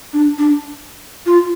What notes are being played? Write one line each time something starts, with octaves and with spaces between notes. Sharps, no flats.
D4
D4
F4